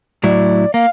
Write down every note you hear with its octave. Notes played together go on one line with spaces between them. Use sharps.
A2 F#3 E4 D5
A#3 F5